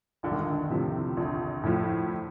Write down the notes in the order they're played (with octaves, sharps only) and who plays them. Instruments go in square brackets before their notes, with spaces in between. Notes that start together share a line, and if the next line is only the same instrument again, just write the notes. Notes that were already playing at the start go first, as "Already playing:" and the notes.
[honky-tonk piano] A#1 [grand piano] D3
[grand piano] D#3
D3
[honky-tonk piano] A2 F3 [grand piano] C3
[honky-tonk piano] A#1 [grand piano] D3
[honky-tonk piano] A2 F3